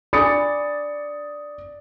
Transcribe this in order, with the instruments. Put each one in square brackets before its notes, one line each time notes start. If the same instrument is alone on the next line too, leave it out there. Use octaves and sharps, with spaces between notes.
[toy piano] D4 B5 [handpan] D5 [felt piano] D#6 A6 C#7